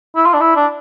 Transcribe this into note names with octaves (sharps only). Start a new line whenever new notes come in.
E4
F4
D4
E4
D4